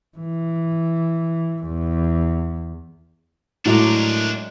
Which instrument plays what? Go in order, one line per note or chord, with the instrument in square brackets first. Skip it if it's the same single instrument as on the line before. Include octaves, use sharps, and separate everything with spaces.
[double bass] E3
E2
[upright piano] A2 [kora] F#3 G#3 D5 [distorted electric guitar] D4 A#4